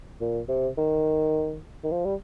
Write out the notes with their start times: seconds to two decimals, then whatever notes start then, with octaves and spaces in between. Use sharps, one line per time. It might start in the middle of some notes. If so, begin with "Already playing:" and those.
0.21 A#2
0.48 C3
0.78 D#3
1.84 D#3
1.92 F3
2.05 G3